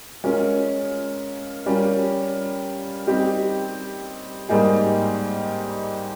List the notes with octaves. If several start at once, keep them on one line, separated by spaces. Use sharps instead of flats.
G#3 C#4 F4 A#4
G3 C#4 F4 A#4
G3 C4 D#4 G4
G#2 G3 A#3 D#4 G#4